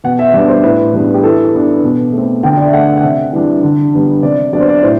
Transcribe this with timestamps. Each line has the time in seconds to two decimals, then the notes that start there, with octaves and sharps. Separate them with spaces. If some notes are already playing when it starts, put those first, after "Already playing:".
0.04 B2 F#5
0.19 E5
0.34 G3 B3 D4 D5
0.48 C5
0.63 A2 B4
0.94 G3 B3 D4
1.14 G4
1.23 E3 A4
1.54 B3 D4
1.84 B2
2.13 A3 C4
2.43 D3 G5
2.57 D5
2.65 E5
2.73 A3 D4 F#5
2.97 F#5
3.03 C3 E5
3.33 E3 G3 D4
3.63 D3
3.93 G3 B3 D4
4.23 C3 D5
4.53 F#3 B3 D4 D5
4.60 C5
4.68 D5
4.83 A2 C5